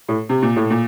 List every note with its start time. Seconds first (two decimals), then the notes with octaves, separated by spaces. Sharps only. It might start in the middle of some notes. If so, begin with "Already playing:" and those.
0.09 A2
0.29 C3
0.42 A#2
0.56 A2
0.70 A#2